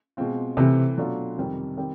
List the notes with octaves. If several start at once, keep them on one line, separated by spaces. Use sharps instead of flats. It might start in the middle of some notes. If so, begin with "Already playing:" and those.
B2 G#3 C4 F4
C3 E3 A3 C4
B2 F#3 A3 D4 F4
F2 C3 D#3 G3
D#3 G3 C4